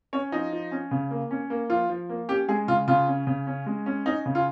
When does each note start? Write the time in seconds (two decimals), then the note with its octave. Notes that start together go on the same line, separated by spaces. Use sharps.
0.13 C#4 C#5
0.32 F3 D#4
0.53 F3
0.72 C#4
0.91 C#3
1.11 A#3
1.31 C#4
1.50 A#3
1.70 F3 F4
1.90 F3
2.09 A#3
2.29 C#4 G4
2.49 G#3 G#4
2.68 C#3 F4
2.88 C#3 F4
3.07 C#4
3.27 C#3
3.47 C#4
3.66 G#3
3.86 C#4
4.06 C#4 D#4
4.26 C#3
4.35 F4